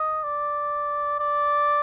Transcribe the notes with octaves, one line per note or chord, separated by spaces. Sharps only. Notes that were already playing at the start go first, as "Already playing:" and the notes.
Already playing: D#5
D5
D5